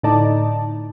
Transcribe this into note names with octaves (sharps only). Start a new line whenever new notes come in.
A2 D3 D#4 D5 D#5 A5